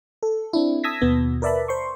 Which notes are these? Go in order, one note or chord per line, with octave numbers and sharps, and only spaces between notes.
A4
C4 D4 E4
A5 D#6 E6 G#6 A#6 B6
D#2 B2 B3
A#4 B4 D5 E5 A5 B5
C5 C6 C#6